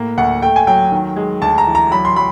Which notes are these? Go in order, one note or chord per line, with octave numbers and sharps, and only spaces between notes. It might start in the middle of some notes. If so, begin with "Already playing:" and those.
Already playing: A2 A#3
D2 F#5
A3 G5
G#5
F#3 G5
D#3
G#3
D2 A5
A#5
E3
A#5
F#3 B5
C6
F#3 B5